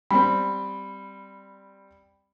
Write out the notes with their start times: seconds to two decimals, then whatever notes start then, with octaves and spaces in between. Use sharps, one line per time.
0.11 G3 C4 B5